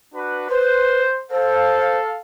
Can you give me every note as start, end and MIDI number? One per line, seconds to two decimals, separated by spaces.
0.14 0.47 62
0.14 0.47 66
0.14 0.47 71
0.49 1.02 71
0.49 1.18 72
1.31 2.18 69
1.31 1.97 72
1.31 2.18 77